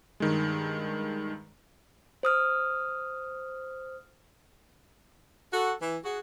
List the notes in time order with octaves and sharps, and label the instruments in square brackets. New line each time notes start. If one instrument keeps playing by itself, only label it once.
[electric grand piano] G2 D#3 G#3
[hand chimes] C5 D#6 F6
[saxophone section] F#4 A4
E3
F#4 G#4